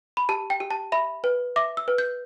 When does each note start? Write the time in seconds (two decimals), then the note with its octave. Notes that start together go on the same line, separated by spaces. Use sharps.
0.17 B5
0.29 G4 A5
0.50 G5
0.60 G4
0.71 A5
0.92 E5 B5
1.24 B4
1.56 E5 D6
1.77 E6
1.88 B4
1.98 G6